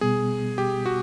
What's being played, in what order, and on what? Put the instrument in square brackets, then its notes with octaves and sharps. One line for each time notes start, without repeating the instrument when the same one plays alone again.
[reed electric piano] B2 G3 B3 [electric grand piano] G#4
[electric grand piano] G4
F#4